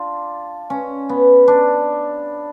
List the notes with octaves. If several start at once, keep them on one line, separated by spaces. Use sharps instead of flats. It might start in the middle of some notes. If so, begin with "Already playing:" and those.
Already playing: D4 F4
C#4
B3
D4